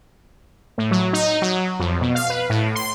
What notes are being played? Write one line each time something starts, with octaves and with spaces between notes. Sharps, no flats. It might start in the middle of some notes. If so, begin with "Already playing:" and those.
A2
F#3
D#4
F#3
F2
B2
F5
B4
A2
C6